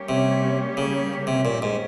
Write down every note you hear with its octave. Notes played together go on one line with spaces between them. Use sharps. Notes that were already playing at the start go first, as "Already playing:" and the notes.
Already playing: G3 A#3 C#4 G4 C#5
C3
C#3
C3
A#2
G#2